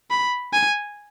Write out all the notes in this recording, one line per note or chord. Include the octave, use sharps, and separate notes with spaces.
B5
G#5